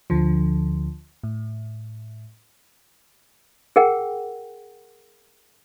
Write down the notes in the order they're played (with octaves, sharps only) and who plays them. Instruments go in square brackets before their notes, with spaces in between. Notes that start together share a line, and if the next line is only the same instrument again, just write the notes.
[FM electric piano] D2 D3 F3
A2
[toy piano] G#4 A#4 F#5 G5